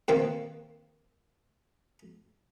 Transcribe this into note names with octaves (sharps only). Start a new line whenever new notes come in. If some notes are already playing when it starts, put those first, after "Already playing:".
B2 D#3 A#3 C4